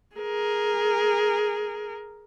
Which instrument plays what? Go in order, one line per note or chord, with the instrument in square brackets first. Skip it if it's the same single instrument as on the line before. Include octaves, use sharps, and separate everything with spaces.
[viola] G#4 A#4